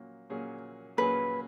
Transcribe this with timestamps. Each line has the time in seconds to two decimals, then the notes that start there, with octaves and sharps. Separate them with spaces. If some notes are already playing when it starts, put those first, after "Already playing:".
Already playing: A#2 F#3 A#3 C#4
0.30 A#2 F#3 A#3 C#4 G#4
0.97 A#2 F#3 A#3 C#4 G#4 B4